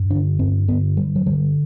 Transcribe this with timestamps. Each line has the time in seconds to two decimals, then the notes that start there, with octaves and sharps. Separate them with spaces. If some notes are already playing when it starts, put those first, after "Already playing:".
Already playing: G2
0.10 D3 D4
0.39 G2 C4
0.68 D3 B3
0.97 G2 G3
1.16 F#3
1.26 D3 G3